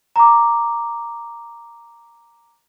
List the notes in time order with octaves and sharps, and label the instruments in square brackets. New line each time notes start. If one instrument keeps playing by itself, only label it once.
[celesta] A#5 D6